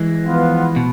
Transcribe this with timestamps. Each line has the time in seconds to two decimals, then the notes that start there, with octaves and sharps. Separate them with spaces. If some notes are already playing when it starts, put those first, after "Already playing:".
Already playing: E3 G#3
0.24 F3 B3 F4
0.76 B2